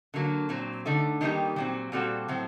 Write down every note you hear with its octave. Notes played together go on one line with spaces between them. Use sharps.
D3 F#3 A#3
A#2 F#3 C4
D3 A3 D#4
D#3 G3 A#3 D#4 G4
A#2 F#3 C4
A#2 G3 C4 F#4 A4
A2 F#3 C4